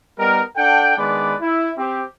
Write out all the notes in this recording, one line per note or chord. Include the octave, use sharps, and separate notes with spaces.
G3 B3 D#4 A#4
D4 A4 F#5 G5
D#3 G#3 B3 D4 B4 D5
E4
C4 G4